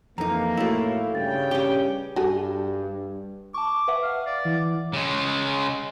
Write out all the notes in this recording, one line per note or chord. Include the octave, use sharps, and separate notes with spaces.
F2 E3 A#3 D#4 A#5
A2 A3 E4 F#4 E5 F5
G2 C#3 G5 A6
C#4 G4 G7
G2 F#4 G#4 A4
A5 C#6 D6
B4 E5 F#5
F5
D5
E3
C#3 G#3